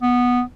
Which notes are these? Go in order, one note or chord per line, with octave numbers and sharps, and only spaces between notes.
B3